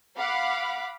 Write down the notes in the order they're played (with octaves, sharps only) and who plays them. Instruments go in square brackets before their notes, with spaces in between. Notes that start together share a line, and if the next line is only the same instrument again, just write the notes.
[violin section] F5 F#5 B5 D6